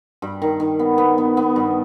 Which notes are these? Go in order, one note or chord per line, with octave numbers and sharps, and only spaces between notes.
G2
D#3
D#3
B3
B3
B3
B3
G2